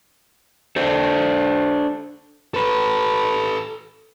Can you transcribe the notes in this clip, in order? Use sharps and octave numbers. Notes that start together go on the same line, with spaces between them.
D4 A4 C5
A4 B4